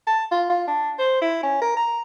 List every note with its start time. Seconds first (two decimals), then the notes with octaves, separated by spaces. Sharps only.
0.07 A5
0.31 F4
0.50 F4
0.67 D4
0.99 C5
1.21 E4
1.43 C#4
1.61 A#4
1.77 A#5